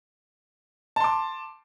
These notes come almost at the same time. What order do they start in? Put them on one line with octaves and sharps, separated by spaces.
A5 C6 D6